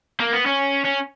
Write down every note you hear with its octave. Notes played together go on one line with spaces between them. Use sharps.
A#3
B3
C#4
C#4